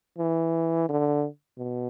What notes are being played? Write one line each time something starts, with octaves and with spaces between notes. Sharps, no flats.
E3
D3
B2